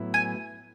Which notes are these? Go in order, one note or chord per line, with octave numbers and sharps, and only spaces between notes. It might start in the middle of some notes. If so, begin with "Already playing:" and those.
Already playing: A2 F#3 B3 E4
G#5